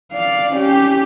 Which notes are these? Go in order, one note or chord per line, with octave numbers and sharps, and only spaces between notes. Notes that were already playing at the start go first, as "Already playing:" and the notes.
D5 F5
C#4 G4